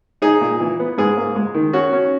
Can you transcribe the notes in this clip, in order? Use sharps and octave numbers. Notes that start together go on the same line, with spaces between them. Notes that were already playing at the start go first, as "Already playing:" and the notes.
D#4 G#4
A#2
E3
B3
G#2 G#4
A#3
G#3
D#3
C#4 F#4
C#4